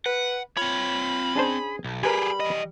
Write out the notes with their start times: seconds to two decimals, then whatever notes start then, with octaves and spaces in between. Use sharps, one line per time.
0.06 B4 F#5
0.57 C4 F4 C#5 B5
1.35 C#4 D4 G#4 C5
1.84 B1
2.03 G3 G4 G#4 A#4 B4 G#5 B5
2.40 E3 D#5